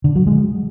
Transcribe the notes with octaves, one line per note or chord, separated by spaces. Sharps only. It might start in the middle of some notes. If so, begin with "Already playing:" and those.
D3
F#3
G#3